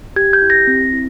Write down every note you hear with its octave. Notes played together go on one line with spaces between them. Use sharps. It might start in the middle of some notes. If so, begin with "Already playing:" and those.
G4 G#6
G6
E4
A#6
C4
E4